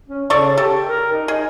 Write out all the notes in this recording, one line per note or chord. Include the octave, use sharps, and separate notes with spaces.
C#4
C#3 A4 D5 C#6
G4 A4
A#4
D#4
D#4 G#4